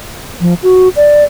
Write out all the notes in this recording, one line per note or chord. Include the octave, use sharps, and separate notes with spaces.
F3
F#4
D5